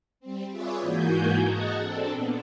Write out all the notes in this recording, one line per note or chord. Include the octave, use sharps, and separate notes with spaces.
G3 C4
F4 G#4 B4 C#5 D5 E5
G#2 E3 A#3 F#4 G#5 G6
F#4 G#4 D#5 F#5 A5 A#5
C4 D4 A4
A#2 B3